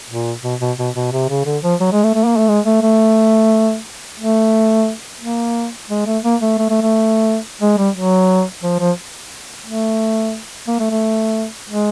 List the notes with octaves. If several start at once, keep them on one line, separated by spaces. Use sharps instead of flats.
A#2
B2
B2
B2
B2
C3
C#3
D3
F3
F#3
G#3
A3
A3
A#3
A3
G#3
A3
A3
A3
A#3
G#3
A3
A#3
A3
A3
A3
A3
G#3
G3
F#3
F3
F3
A3
A#3
A3
A3
G#3